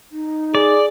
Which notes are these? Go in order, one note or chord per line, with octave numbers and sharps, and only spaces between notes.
D#4
G#4 D5